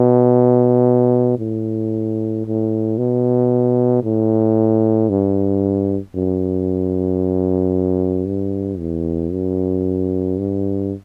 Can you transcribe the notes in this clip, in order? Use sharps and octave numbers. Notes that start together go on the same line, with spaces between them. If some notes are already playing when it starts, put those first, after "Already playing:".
Already playing: B2
A2
A2
B2
A2
G2
F#2
G2
E2
F#2
G2